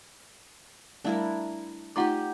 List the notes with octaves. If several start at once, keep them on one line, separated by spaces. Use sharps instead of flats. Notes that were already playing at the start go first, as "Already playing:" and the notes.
G3 A3 D4 E4 A#4 F5
A3 D#4 F4 G4 D5 F#5 A#5 D6